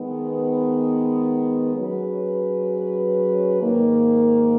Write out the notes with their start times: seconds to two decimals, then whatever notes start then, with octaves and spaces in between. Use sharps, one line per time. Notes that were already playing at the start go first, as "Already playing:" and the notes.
Already playing: D#3 G#3 B3
1.75 F#3 C#4 G#4 B4
3.61 G#2 D#3 A#3